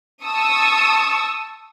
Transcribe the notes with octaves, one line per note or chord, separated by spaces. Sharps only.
A5 C#6 D#6 E6